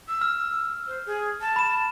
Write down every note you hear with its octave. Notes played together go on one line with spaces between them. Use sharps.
E6
F6
C5
G#4
A5
B5 E7